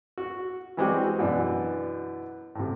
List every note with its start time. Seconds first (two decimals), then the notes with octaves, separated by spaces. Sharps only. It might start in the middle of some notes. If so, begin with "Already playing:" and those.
0.18 F#4
0.77 E3 G3 G#3 C4 F#4 G4
1.19 F#2 B2 E3 D4
2.55 A2 C3